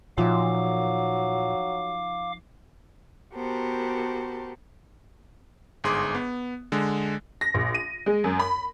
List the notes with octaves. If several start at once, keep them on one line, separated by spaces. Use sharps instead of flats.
A#2 F3 F#3 D#4 E5 F5 D6
B3 F#4 G4 A#4 C5 A5
G1 G#2 G#4 C6 D6
B3
D3 G#3
A#6
A#1
D#7
G#3
F#2
B5